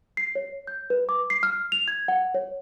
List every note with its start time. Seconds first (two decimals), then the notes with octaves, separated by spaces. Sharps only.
0.17 C7
0.35 C#5
0.67 G6
0.90 B4
1.09 D6
1.30 C7
1.43 F6
1.72 F7
1.88 G#6
2.08 F#5
2.34 C#5